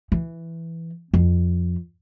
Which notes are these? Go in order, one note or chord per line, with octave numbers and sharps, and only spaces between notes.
E3
F2